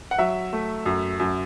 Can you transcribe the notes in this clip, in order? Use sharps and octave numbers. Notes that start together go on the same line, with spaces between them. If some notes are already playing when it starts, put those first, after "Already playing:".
F#5
F#3 E5
A3
F#2
F#2